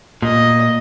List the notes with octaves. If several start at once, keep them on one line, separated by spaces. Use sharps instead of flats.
A#2 D#5